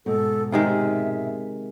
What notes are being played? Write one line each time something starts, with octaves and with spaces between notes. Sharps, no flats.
G#2 B2 A4
C3 D#3 G#3 E5